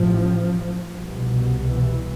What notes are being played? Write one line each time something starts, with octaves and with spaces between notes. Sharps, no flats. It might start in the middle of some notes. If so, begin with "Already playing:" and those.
Already playing: A1 A2 F3
C2 B2
E3